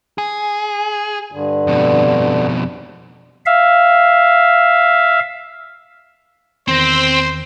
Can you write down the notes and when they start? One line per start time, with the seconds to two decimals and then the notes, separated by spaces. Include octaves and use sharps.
0.18 G#4
1.32 G2 D3
1.67 F2 B2
3.46 E5 F5
6.68 E2 D#3 C4 C5 A#6